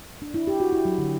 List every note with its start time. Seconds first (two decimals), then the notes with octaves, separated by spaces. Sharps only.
0.22 D4
0.34 E4
0.47 G4
0.60 F#4
0.73 E4
0.85 F#3
0.98 D3